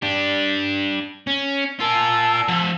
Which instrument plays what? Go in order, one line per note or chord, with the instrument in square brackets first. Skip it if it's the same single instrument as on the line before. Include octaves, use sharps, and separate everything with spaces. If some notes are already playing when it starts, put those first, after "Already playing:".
[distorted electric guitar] D4 G4
C#4
[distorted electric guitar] F4 A#4 [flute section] G#5 A5 E6
[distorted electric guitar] F3 F#5